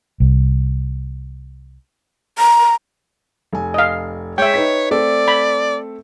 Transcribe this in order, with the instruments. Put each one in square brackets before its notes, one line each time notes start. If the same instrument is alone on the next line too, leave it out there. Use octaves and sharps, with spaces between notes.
[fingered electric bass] C2
[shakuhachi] A#5
[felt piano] F1 G#5
[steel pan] D#5 F5
[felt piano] G#3 [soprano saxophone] C#5 [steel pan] E5 G5
[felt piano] D#4 B4 B6
[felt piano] A3 C4 A4 [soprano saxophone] D5
[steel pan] B5